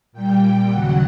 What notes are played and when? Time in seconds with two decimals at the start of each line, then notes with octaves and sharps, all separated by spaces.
0.12 A#2 G3 G5
0.68 D#2 C#3 F#3 F#5